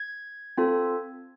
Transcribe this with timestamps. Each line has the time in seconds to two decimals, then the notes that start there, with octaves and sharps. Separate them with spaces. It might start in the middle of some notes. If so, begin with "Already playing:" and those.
Already playing: G#6
0.58 C4 F4 A4